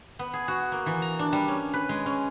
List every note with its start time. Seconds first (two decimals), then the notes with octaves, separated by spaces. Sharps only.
0.19 B3
0.33 G#4
0.48 F#4
0.72 A#3
0.86 E3
1.02 A#5
1.19 D4
1.33 G3
1.48 C#4
1.73 B4
1.89 G#3
2.06 C#4